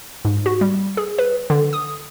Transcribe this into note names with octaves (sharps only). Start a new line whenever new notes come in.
G#2
F#4
G3
G#4
B4
D3
D#6